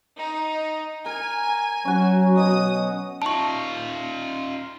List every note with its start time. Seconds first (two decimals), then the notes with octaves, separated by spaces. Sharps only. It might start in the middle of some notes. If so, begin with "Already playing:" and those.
0.17 D#4
1.06 A#4 G#5
1.85 F#3 C#4 F#4
2.37 B2 C#5 D#5 D#6
3.22 D#4 F4 A5 C#6